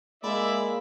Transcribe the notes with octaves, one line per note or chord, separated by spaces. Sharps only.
G#3 A#3 E4 D5 E5 F5 B5